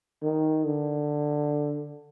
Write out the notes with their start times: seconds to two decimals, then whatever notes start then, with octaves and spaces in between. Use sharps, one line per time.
0.23 D#3
0.65 D3